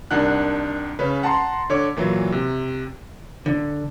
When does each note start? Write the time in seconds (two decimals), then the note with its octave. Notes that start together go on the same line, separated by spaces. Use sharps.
0.11 C2 D#3 D4 F#5 F#6
0.99 C#3 C#4 B4
1.23 F#5 A5 A#5 C6
1.70 D3 C#5 D6
1.97 A#2 E3 F#3
2.32 C3
3.46 D3